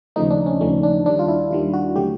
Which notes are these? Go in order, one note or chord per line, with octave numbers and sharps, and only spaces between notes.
D#2 C#3 F3 A3 D#4
D4
C#4
D#2 C#3 F3 A3 C#4
D4
D#2 D#3 G3 D4
F4
E4
D#2 D#3 G3 F4
F#4
D3 F#3 A3 G4